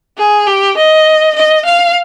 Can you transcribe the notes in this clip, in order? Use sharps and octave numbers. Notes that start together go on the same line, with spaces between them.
G#4
G4
D#5
D#5
F5